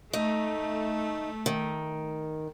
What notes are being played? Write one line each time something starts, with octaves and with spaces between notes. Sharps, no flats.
A3 D#4
D#3